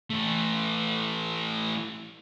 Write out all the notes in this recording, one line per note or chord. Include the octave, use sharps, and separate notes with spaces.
E3 A3